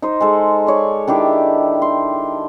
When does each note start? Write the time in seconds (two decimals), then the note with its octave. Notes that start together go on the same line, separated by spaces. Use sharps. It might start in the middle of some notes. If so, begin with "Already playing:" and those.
0.02 D#4 C5
0.21 G#3 A4
0.67 C#5 D5
1.08 D#3 D4 E4 G4
1.82 C6